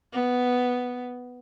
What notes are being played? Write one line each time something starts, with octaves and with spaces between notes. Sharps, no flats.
B3